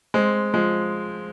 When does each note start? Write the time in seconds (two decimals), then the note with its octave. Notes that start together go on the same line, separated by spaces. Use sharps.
0.14 G#3 C4
0.54 F3 G#3